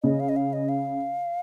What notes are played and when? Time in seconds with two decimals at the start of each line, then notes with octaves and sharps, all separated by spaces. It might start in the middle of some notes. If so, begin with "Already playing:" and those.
0.03 C#3 D#5
0.20 F5
0.29 D#5
0.36 F5
0.53 D#5
0.69 F5